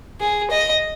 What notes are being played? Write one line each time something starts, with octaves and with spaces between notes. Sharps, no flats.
G#4
D#5